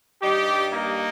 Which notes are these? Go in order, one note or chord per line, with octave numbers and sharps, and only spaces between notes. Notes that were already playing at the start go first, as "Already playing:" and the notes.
G2 G3 D#4 G4
A#3 D#4